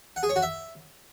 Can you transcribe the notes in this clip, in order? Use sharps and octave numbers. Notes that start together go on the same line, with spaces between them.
F#5
G#4
C#5
F#4
E5